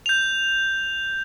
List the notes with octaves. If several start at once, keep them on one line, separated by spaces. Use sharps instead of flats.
G6 F7